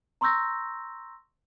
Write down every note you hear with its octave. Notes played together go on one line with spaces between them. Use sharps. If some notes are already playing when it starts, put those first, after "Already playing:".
A#5 C6 C#6 E6 G6 A#6